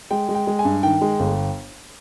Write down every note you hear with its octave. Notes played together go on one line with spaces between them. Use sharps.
G#3 G5
G#3
G5
G#3
G#5
G2
D#3 G5
G#3
G1